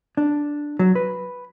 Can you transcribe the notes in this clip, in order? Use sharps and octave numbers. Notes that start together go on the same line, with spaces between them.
D4
F#3
B4